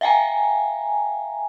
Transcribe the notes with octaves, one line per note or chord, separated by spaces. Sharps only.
E5 F5 G5 G#5 A#5